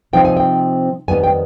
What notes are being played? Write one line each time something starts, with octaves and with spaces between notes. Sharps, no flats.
C3 F3 C4 D#4 G5
G#5
G5
F2 D#3 G3 B3 D#4 G#5
G5